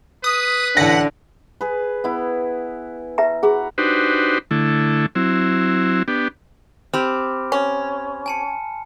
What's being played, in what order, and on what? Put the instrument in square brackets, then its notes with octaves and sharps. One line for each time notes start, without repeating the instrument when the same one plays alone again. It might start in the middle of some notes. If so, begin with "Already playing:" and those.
[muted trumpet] B4 [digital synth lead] D#6
[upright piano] A1 A#6 [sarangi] D3 [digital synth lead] F#5
[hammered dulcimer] G#4 B4
B3 E4
[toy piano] B4 E5 A#5
[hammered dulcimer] F#4 A#5 B5 [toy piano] G#4
[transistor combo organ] D4 D#4 F#4 G4 B4 C5
D3 A3 E4
F#3 C4 E4
B3 D4 G4
[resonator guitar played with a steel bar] C4 G4 [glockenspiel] B5 C6 F6
[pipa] C#4
[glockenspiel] G#5 A5 C#7